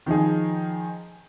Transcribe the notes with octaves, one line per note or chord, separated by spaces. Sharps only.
D#3 F3 D#4 G#4